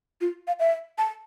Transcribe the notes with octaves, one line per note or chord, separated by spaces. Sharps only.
F4
F5
E5
A5